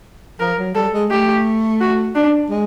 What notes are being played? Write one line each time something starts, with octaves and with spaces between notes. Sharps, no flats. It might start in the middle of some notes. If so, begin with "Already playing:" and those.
F3 A#4
F#3
G3 A4
G#3
A3 G4
F#4
D4
G#3